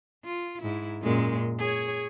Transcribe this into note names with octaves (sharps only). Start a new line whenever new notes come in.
F4
G#2 E4
F#2 A#2 G#3
G#4 C#5